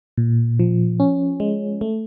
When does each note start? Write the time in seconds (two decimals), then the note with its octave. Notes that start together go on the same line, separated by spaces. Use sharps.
0.18 A#2
0.60 F3
1.00 C#4
1.40 G#3
1.81 A3